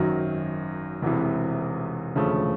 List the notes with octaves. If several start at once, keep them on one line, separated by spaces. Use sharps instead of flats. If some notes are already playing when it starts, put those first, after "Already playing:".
Already playing: G#1 F#2 D#3 F#3
E1 E2 C3 E3
E1 D2 C#3 F3 A3